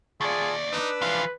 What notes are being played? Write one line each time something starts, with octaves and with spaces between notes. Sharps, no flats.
D#2 F4 G#4 D5 A5
D4 D#4 B4 D6 E6
E3 F3 F5